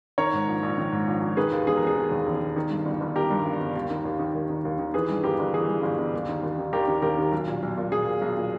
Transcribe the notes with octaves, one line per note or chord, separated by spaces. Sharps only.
D#3 A#4 C#5
G#2
A#1
A#1
D#3
G#2
A#1
A#1
D#3 G#4 B4
D#2
E1 G#4
E1 A#4
G#4
D#3
D#2
E1
E1
D#3
G2
G1
G1
D#3 G4 A#4
G2
G1
G1
D#2
D#3
D#2
D#3
D#2
D#3
D#2
D#3
E3 G#4 B4
G2
G1 G4 A#4
G1
E3 G#4
G2
G1
G1
D#2
D#3
D#2
D#3
D#2 G4 A#4
D#3
D#2 G4 A#4
D#3
B1
A#2
B1
A#2
B1 G#4
A#2
B1
A#2